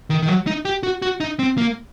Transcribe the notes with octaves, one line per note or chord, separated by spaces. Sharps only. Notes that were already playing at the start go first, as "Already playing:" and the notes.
D#3
D#3
F#3
D#4
G4
F#4
F#4
D#4
C4
A#3